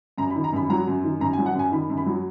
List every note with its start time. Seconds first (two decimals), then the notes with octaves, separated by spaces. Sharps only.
0.18 F#2 A#5
0.30 B5
0.36 D#3
0.44 A#5
0.53 F#2 B5
0.70 F#3 A#5
0.87 F#2
1.04 D#3
1.20 F#2 A#5
1.33 G#5
1.38 F#3
1.46 F#5
1.55 F#2 G#5
1.72 D#3 B5
1.89 F#2
1.97 B5
2.06 F#3